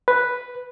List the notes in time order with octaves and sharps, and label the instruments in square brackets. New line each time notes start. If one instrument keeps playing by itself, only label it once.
[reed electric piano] B4